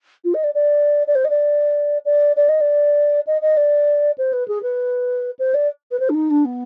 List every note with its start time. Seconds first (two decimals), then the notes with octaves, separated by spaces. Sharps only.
0.24 F4
0.34 D#5
0.43 D5
0.54 D5
1.07 D5
1.15 C5
1.24 D#5
1.30 D5
2.05 D5
2.36 D5
2.49 D#5
2.60 D5
3.27 D#5
3.41 D#5
3.57 D5
4.18 C5
4.33 B4
4.48 G#4
4.62 B4
5.39 C5
5.54 D5
5.91 B4
5.99 C5
6.09 D4
6.14 D#4
6.30 D4
6.45 B3